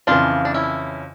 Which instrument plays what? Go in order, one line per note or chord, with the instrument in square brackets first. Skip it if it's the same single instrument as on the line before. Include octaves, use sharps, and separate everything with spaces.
[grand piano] F2 C#3 E3 [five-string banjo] D4 F4
[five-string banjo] D4
C#4 E4